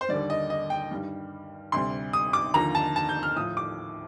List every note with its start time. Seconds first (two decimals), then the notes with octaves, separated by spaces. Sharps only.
0.01 C5
0.09 D#2 D3 G3 D5
0.30 D#5
0.50 D#5
0.70 G5
0.91 G2 D#3 G3
1.72 D2 C3 G3 C6
2.13 D#6
2.33 D6
2.54 D#2 D3 F3 A#5
2.75 A5
2.96 A5
3.09 G6
3.23 F6
3.36 A2 F3 D#6
3.57 D6